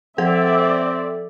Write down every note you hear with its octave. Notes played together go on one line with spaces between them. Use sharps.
F3 C4 A4 D5 E5